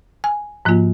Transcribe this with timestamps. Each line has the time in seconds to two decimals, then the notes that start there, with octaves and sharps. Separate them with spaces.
0.24 G#5
0.65 G#2 F3 A#3 F4